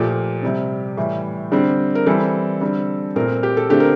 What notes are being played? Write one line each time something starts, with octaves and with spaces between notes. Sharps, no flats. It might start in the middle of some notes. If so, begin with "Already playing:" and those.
Already playing: A#2 F3 A3 G4
C3 G3 C4
A2 E3 G3
D3 G3 C4
A#4
E3 G3 C4 A4
D3 G3 C4
A#2 A3 C4 A#4
G4
A4
D3 A3 C4 G4
A#4